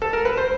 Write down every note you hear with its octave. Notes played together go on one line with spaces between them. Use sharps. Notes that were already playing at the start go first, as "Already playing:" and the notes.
A4
A#4
B4
C5